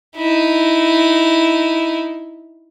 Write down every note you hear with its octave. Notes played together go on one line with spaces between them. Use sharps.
D#4 E4